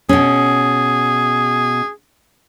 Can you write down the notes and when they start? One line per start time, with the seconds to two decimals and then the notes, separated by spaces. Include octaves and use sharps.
0.09 B2 C#4 G#4